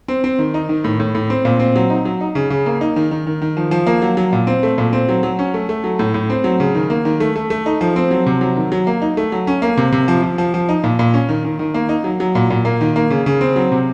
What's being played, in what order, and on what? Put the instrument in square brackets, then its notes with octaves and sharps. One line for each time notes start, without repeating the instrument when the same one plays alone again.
[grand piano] C4
C4
D#3
D#4
D#3
A2
A2
A2
C4
A#2
C4
F#3
D#4
F#3
D#4
C#3
C#3
A#3
D#4
D#3
D#3
D#3
D#3
F3
F3
A#3
F#3
F#3
A#2
C4
A3
A#2
C4
F#3
F#3
C#4
A3
A3
F#3
A2
A2
C4
F#3
C#3
D#3
A#3
D#3
A3
A3
A3
D#4
F3
C4
F#3
C3
F#3
D#3
F#3
A#3
D#4
A3
F#3
C#4
A#3
C3
C3
F3
F3
F3
F3
D#4
A#2
A#2
C#4
D#3
D#3
D#3
A#3
D#4
F#3
F#3
A#2
A#2
A#3
D#3
A#3
C#3
C#3
C4
F#3
C3